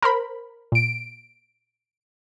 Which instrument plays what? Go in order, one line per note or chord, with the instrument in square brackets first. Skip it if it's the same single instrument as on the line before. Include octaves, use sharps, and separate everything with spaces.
[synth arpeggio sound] A#4 C5 B5
[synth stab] A#2 D7